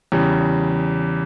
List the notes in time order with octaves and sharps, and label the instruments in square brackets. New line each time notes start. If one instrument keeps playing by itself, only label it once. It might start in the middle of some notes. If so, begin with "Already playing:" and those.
[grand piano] E2 C#3 G3